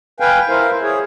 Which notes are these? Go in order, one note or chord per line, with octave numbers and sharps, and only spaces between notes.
B4 F5 G5 G#5
E4 A#4 C5 F5
G#4 C#5